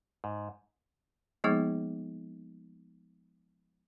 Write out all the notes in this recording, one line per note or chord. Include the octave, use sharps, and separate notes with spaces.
G#2
F3 G#3 A#3 B3 D#4 G#4